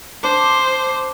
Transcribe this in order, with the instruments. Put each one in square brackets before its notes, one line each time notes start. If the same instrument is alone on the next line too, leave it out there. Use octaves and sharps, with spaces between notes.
[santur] D4 [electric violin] C5